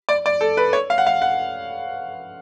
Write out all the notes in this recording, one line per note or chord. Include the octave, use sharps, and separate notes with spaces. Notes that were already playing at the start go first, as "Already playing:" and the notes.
D5
D5
A4
B4
C#5
F5
F#5
F5
F#5